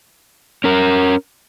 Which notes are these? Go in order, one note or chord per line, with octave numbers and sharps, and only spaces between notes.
C#4 A#4